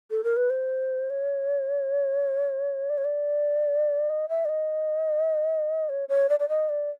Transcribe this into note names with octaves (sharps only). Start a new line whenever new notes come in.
A4
A#4
B4
C5
C#5
D5
C#5
D5
D#5
E5
D5
D#5
C#5
C#5
D5
D5
D#5
D5